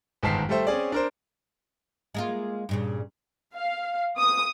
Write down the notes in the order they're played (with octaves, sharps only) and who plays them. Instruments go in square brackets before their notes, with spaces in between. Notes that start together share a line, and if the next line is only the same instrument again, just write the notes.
[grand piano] G1 G#2 D#3 A5 B6 C7
G3 A3 G4 A4 C5 E5
C4 C#4 G#4 D5
D4 A#4 C5
[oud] G#3 A#3 F4
G2 A#2 C#3
[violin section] F5
D#6